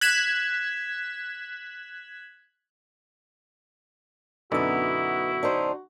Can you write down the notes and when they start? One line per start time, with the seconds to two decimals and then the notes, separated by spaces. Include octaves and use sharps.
0.01 F#6 G#6 B6 E7
4.52 F#2 B2 D3 B3 D#4 E4 F#4
5.43 D4 D#4 C5